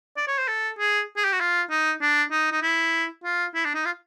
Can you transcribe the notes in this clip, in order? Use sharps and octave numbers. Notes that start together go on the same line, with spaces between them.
D5
C#5
C5
A4
G#4
G#4
G4
F#4
F4
D#4
D4
D#4
D#4
E4
F4
E4
D4
D#4
F4